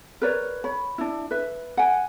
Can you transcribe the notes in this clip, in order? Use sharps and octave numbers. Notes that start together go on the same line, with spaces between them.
A#4 B4 C#5 D5
C#5 B5
D4 E4
B4 E5
F#5 G#5